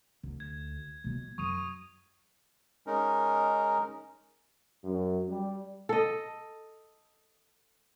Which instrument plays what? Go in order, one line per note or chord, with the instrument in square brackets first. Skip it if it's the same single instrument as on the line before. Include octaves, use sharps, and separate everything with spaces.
[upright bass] D2
[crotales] G#6
[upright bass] B2 F#3
[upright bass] F#2 [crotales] C#6 D#6 D#7
[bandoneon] G#3 C#4 D#4 A#4
[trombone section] F#2
G3
[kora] A4 D#5